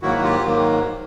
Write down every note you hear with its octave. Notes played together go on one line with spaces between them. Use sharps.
G#2 D#3 F#3 A#3 E4 F#4
F#4
F4 G4
G#2 D#3 F#3 A#3